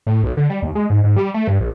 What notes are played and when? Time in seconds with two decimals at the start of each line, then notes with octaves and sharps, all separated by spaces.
0.06 A2
0.23 B1
0.37 D3
0.49 G3
0.62 D#2
0.75 G#3
0.90 G#2
1.04 G#2
1.16 G3
1.34 A3
1.48 G2
1.60 A#1